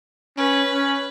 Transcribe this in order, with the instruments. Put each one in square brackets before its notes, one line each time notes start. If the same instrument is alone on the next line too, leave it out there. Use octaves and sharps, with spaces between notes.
[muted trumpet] C#4 [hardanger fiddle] B4
[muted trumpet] C#4